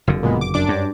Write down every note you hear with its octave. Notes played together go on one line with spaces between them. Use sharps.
F#1 F2 D3
A#2 G#3 B3
D6
F#2 D4 D6
G2